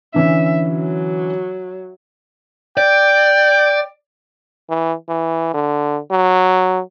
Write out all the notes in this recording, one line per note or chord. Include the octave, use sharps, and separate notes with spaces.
D3 E3 C#4 E5
F#3
D5 G5
E3
E3
D3
F#3